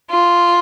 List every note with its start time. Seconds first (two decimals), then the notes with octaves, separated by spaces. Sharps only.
0.11 F4